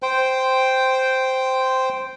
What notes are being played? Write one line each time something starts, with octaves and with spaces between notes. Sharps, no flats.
C5 G5